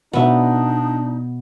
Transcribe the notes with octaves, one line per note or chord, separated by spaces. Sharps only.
B2 B3 D4 D#4 E5